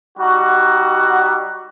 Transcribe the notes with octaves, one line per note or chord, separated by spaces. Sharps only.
G3 D#4 F#4